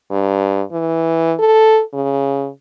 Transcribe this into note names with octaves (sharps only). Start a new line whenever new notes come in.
G2
E3
A4
C#3